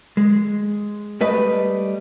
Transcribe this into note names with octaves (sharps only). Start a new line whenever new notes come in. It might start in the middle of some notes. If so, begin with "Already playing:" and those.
G#3
G3 A3 B4 D#5